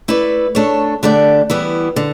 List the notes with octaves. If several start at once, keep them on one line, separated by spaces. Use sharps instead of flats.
A3 E4 B4 D5
A3 D4 A4 C#5
D3 A3 D4 G4 D5
E3 G3 B3 E4
D3